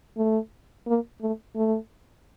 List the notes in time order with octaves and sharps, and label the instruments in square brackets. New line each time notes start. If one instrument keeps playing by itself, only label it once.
[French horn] A3
A#3
A3
A3